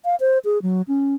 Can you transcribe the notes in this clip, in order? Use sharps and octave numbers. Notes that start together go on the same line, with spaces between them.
F5
C5
G#4
F#3
C#4